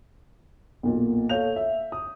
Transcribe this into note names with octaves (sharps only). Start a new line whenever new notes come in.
B1 A#2
A4 C#5 F5 G6 F7
E5
D#6